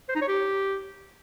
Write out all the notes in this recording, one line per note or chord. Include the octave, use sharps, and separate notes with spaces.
C5
D#4
C#5
G4